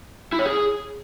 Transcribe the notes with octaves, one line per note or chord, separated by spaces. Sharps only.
E4
C#5
G#4